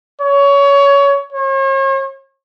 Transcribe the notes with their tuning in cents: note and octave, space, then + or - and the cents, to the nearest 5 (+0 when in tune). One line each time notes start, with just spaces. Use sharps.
C#5 +20
C#5 -40